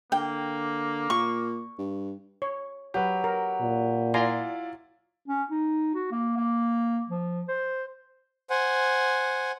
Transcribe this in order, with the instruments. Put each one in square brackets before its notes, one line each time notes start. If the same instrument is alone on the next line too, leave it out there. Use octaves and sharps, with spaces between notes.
[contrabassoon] D3 [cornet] A#3 [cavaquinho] G5
[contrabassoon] A#2 [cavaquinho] C#6
[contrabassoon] G2
[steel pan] C#5
[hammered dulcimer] F#3 [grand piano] G4 B4
[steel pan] A#4
[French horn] A#2
[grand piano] E4 F4 D5 [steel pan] G#5 A#5 C6
[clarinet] C#4
D#4
F#4
A#3
A#3
F3
C5
[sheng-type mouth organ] C5 F#5 G#5